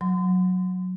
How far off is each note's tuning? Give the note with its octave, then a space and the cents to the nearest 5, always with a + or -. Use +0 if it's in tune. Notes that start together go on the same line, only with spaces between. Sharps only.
F#3 -10 C6 -35